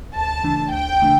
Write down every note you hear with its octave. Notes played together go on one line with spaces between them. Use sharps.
D2 A5
C#3 E3 A3 D4
D2 G5
C#3 E3 A3 D4